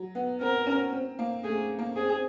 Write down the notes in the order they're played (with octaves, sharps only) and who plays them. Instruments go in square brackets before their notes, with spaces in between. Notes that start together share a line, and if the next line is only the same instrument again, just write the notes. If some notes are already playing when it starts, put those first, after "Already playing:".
Already playing: [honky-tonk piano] F#3
B3
[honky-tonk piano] C4 [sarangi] A#4
[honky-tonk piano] C#4
C4
A#3
[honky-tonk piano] A3 [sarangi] G#4
[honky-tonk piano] A#3
[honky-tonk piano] C4 [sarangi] G#4
[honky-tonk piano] C4